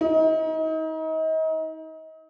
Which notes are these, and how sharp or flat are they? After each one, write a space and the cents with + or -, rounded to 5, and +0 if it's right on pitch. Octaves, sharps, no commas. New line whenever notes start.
D#4 +35